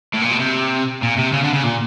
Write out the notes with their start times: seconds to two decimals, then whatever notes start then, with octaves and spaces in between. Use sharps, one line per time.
0.14 A2
0.22 A#2
0.32 B2
0.40 C3
1.02 A#2
1.17 C3
1.32 C#3
1.43 D3
1.53 C#3
1.63 A#2